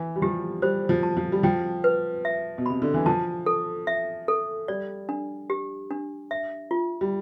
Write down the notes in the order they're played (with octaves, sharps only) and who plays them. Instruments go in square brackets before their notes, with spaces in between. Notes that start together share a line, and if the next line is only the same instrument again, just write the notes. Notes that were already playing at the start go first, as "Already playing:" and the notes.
Already playing: [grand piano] E3
G3
[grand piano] F3 [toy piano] G4
[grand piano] G3 [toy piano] C5
[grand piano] F3
[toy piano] A5
[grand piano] F3
G3
[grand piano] F3 [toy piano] G5
[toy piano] B4
E5
[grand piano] B2
[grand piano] C3 [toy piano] B5
[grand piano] D3
E3
[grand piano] F3 [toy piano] A5
[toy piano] A4
E5
A4
[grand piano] G3 [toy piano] D5
[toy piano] D4
G4
D4
E5
F4
[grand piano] G3